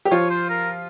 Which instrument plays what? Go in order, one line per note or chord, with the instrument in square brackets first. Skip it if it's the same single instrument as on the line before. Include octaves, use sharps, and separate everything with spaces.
[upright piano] G4
[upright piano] F3 F4 [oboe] C#5
[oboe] C5
A#4